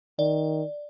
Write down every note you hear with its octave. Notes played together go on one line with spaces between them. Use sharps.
D#3 D5